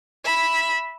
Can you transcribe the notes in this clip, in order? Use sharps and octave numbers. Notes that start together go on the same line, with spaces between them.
E5 B5